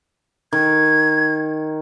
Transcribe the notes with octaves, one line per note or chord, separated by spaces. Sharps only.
D#3 G#6